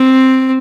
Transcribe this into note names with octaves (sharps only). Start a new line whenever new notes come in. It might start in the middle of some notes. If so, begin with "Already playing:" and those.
Already playing: C4